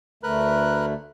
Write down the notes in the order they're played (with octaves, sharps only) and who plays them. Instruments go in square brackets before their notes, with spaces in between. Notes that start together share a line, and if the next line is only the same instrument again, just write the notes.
[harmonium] D2 D3 A3 [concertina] A#4 B4 F#6